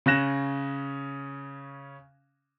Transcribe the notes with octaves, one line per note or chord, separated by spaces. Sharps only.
C#3 C#4 F#6 A#6 E7